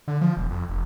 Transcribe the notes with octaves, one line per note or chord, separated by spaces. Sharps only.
D3
F3
E1
F2
F1